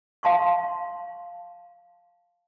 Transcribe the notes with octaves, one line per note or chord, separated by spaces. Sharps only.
F5 A5 C6 C#6